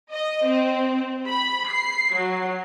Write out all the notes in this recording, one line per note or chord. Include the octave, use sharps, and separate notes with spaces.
D#5
C4
B5
C7
F#3